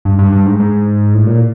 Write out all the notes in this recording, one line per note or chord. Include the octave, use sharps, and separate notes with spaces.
G2
G2
G2
G#2
G#2
A2
A#2